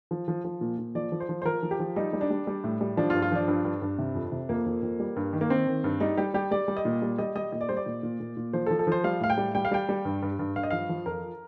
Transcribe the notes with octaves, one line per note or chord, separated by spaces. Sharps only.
F3
F3
F3
A#2
A#2
F3 D5
F3
C5
F3
C5
F3 A#4
F3
G4
F3
G3 D#4
G3
D4
G3
G3
A2
G3
F3 D4
F4
G2
F4
F3 D4
G2
G2
G2
C3
F2
C3
F2 A#3
F2
F2
G3
G2
D#3
A#3
D#3 C4
D#3
G2
G3 D#4
G3 G4
G3 G4
G3 D5
G3
D#5
A#2
G3
G3 D#5
G3 D#5
A#2 D#5
D5
G3 C5
D5
A#2
A#2
A#2
A#2
F3 C5
A4
F3
A4
F3 C5
G3 F5
A2 F5
G5
G3
G3 G5
F5
G3 G5
G3
G2
G2
G2
G2 F5
D#5
F3 F5
F3
F2 A#4